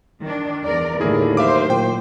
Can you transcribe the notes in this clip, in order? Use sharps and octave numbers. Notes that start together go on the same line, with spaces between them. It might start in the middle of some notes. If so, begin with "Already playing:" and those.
D#3 D4
E2 A#4 D5
D#2 A2 D3 G#3 E4 G#4 A#4
F#3 C5 E5 F5 D6
A#2 G5